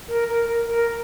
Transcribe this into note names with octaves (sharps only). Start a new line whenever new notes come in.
A#4
A#4
A#4
A#4